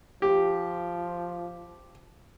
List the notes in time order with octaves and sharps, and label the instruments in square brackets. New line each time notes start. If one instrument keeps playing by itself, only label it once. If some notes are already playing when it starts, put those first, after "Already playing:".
[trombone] F3 [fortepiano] G4